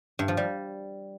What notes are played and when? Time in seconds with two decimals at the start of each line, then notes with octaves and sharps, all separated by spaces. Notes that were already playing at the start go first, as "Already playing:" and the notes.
0.19 G2
0.28 F3
0.37 G3